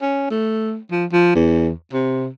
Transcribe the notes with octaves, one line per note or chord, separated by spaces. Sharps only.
C#4
A3
F3
F3
E2
C3